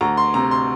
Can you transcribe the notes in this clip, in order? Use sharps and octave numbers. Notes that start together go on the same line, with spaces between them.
D2 A#5
C6
C3 A#5
C6